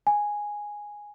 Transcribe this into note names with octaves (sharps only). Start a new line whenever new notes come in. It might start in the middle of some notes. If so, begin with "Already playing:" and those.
G#5